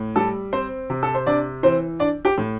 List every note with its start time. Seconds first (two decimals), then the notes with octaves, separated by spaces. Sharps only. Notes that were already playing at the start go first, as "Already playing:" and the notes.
Already playing: A2
0.16 G3 A4
0.53 C4 C5
0.90 C3
1.03 A4
1.15 C5
1.26 C3 D4 D5
1.63 E3 C4 C5
2.00 D4 D5
2.25 G4 G5
2.38 A2